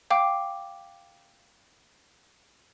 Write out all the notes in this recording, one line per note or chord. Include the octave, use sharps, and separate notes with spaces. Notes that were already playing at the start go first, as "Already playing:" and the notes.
F5 G5 D6